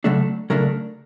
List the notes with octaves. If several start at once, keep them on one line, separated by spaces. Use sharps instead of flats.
C#3 F#3 A3 D4 A4
C#3 F#3 A3 D4 A#4